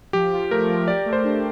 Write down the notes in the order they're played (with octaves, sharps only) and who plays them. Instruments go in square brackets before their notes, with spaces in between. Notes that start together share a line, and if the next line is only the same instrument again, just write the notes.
[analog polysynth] F3 [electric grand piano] G4
[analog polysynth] F4
[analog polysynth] A3 [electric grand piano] A#4
[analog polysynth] F3
[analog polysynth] G4 [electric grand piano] D5
[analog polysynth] A3
[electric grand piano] C5
[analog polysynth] D4